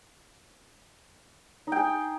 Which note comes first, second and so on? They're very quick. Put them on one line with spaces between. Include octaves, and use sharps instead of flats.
D#4 G5 G#4